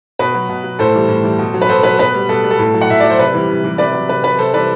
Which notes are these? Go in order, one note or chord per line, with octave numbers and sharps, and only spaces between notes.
B2 B4
F#3
B2
F#3
A2 A4 C5
E3 G3
A2
E3 G3
B2
F#3
B4
B2 A4 C5
F#3 B4
B2 B4
G3
B2 A4
G3
A4
A2
F#3
F#5
A2 E5
F#3 D5
C5
C3 B4
E3 G3
C3
E3 G3
C3 B4 D5
F#3
C3 B4
F#3 B4
C3 A4 C5
E3 G3 B4 D5